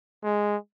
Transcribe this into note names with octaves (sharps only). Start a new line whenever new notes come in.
G#3